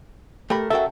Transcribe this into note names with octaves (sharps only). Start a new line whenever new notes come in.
A3 G4 A#4 B5
C#3 F#4 A4 A#4 E5 G5